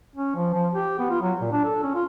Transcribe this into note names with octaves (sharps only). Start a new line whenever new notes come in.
C#4
F3
F3
G4
B3
F4
F#3
A#2
D4
A4
C#4
F4